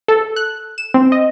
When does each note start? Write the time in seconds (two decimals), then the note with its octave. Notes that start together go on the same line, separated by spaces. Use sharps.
0.08 A4
0.36 F#6
0.78 E7
0.94 C4
1.12 D#5